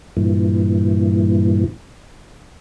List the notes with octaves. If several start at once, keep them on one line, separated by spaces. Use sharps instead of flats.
G2 A#2 E3